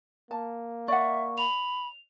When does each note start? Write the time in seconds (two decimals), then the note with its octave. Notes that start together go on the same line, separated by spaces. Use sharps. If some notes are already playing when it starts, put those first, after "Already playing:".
0.31 A#3 A5
0.88 D5 E5 F#5 C#6
1.38 B5 F7